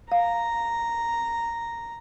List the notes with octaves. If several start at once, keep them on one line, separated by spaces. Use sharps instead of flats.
F5 A#5